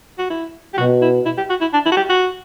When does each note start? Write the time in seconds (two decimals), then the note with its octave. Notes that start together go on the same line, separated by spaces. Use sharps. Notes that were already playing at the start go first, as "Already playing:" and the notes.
0.19 F#4
0.30 E4
0.74 G4
0.78 B2 F#4
1.02 E4
1.26 E4
1.37 G4
1.50 F#4
1.61 E4
1.73 D4
1.86 E4
1.92 F#4
1.97 G4
2.10 F#4